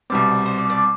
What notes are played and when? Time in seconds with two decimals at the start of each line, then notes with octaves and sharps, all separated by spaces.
0.10 C2 B2 G3 C4 D5
0.46 C5
0.58 D5
0.70 D5